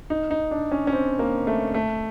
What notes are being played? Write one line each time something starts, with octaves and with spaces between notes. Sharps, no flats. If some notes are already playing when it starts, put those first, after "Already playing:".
D#4
D#4
D4
C#4
C#4
C4
A#3
A3
A3